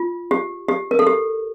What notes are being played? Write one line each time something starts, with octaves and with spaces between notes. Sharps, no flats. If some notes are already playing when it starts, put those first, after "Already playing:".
Already playing: F4
G4
G4
A#4
A4
G4